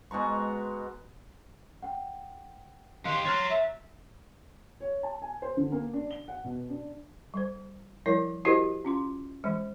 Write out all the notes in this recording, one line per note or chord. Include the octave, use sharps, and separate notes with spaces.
B2 G#3 A#5 C#6
F#5 G5
D#3 G4 F5 C6 F#6 C#7
C#5 A#5 F6 F#6 A6
E5
C#5
A5
G#5
C5
D3
A#3
D4
G7
F#5
B2
D4
G3 C5
F3 G3 E4 A#4 C#5
E4 F#4 G4 A#4 C5 D#5
C#4 F4 C6
E3 G#3